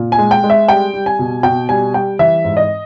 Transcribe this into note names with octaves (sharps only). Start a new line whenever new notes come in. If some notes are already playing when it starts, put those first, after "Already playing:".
Already playing: A#2
G#5
G#3
G5
G#3
E5
G3 G5
G3
G#5
B2
B2 G5
G3 G#5
G3 G5
E3 E5
G#2
D#5